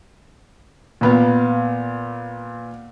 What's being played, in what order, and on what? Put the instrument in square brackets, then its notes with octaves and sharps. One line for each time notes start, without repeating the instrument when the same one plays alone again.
[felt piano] A#2 B3 F5